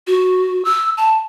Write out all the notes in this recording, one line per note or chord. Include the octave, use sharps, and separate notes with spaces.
F#4
E6
A5